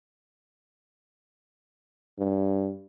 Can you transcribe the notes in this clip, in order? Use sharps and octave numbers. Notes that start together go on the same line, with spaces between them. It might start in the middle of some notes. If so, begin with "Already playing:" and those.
G2